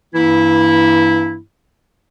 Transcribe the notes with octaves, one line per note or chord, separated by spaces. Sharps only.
G2 E3 A#3 E4